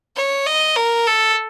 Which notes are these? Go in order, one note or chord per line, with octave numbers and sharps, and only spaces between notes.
C#5
D#5
A#4
A4